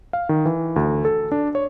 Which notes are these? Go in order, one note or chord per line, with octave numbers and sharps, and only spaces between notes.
F5
D#3
E3
D2
A4
D4
C#5